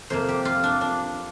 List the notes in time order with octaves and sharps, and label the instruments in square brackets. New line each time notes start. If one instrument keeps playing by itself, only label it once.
[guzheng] F2 C3 A#3 C5
G4
F4
D4
D4